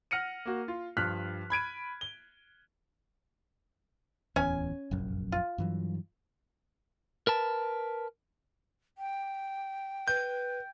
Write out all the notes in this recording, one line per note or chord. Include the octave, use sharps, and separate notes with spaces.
F#5 F6 A#6 C#7 D#7
A#3 F#4
F4
G2 F3 F6 F#6 B6
B5 G#6 D7 D#7
G7
D1 E2 C#4 G#5
F1 A#1 F#2
F4
G2 E3 F#3
A#4 B4 A5
G5
B4 G6